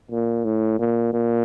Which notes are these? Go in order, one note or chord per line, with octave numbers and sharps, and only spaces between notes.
A#2
A2
A#2
A#2